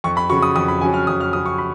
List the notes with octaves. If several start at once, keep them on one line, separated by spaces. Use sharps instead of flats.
F2 C#6
B5
C#3 F#3 C#6
D#6
F2 D#6
B5
C#3 F#3 G#5
F6
F2 D#6
F6
C#3 F#3 D#6
C#6
B5